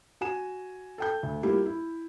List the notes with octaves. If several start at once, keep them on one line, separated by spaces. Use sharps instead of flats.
F#4 G#5 E7
A4 G5 G6
D2
G3 A#3 E4 F4 G4
E4